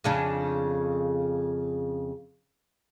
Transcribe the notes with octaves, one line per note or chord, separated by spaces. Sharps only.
F2 C#3 D4